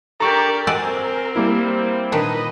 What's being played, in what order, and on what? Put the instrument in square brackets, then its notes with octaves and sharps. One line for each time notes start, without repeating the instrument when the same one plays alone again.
[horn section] D4 A4 D5 [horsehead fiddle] G4 A#4 [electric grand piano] A#5 C#6
[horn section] C4 [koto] F#4 D5 D#5 [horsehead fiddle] A#4 [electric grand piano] G#5 E6
[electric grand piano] G3 A#3 E4
[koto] A#2 D#3 D4 [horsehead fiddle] B4 D#5